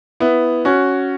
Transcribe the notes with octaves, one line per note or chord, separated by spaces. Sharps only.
B3 E4
C#4 F#4